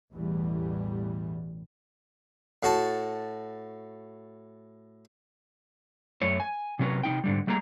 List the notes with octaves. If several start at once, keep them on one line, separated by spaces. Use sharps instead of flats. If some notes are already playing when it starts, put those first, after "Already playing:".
A1 E2 B2 E3 G3
A2 F#4 A5
F#2 A3 C#5
G#5
C3 F#3 C#4 G4 A#4 B4
C3 G#3 D#4 G5
G#2 D3 G3
G3 A3 A#3 G#4 A#5